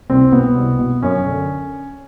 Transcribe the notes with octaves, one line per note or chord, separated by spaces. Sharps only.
C2 C4
B2 B3
C2
B2
F#2 C#4
D3